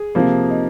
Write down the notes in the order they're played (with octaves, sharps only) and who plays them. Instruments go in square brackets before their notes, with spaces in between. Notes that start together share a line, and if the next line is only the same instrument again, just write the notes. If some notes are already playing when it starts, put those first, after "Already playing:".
Already playing: [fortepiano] G#4
[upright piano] C3 F3 A#3
[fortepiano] D#4